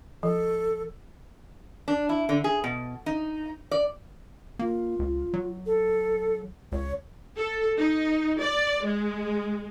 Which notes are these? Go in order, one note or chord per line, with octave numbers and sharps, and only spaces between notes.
F3 A4
D4
E4
D3
G#4
B2
D#4
D5
A#3 F4
C#2
F#3
A4
C#2 C#5
A4
D#4
D5
G#3